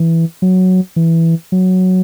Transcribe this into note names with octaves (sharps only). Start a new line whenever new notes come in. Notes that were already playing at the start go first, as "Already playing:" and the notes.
Already playing: E3
F#3
E3
F#3